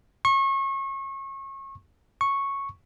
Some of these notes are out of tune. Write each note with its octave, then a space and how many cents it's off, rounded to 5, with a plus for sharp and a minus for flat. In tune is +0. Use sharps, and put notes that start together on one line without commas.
C#6 -30
C#6 -5